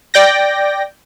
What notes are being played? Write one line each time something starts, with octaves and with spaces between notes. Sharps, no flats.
D5 G5 A#6